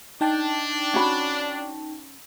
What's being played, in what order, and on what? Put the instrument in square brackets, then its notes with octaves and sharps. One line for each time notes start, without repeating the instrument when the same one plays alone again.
[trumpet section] D4 [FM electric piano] D#4 G5 A5
[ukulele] C#4 F#4 B5